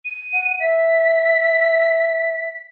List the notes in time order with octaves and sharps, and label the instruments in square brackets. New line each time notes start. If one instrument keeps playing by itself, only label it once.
[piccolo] D#7
[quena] F#5
[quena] E5 [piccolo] B6